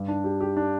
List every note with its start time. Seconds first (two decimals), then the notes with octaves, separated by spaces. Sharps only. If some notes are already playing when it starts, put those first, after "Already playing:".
Already playing: G2
0.08 D4
0.24 G4
0.41 G4
0.57 D4